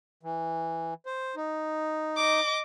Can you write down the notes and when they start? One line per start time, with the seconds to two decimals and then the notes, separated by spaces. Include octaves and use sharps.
0.23 E3
1.06 C5
1.36 D#4
2.17 D#5 D6